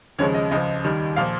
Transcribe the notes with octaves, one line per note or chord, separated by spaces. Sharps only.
D#2 C#3 F3 G#3 C#5
D#5
C#2 C#3 F3 D#5
D#2 D#3 G3
A#2 F3 F5